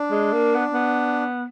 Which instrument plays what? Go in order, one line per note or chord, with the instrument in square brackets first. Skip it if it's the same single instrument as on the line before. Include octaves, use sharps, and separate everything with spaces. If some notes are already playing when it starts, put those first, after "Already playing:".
Already playing: [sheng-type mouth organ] D4
[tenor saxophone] G#3
A#3
B3
B3